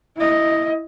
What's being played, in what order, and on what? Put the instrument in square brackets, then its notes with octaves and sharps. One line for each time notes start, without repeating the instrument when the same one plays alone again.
[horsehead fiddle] E4 D#5